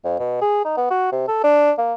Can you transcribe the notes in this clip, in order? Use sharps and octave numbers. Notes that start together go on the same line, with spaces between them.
F2
B2
G#4
D#4
B3
F#4
C3
A4
D4
A#3